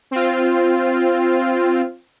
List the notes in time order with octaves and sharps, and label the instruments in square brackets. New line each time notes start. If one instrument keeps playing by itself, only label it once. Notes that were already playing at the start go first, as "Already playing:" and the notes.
[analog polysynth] C4 F4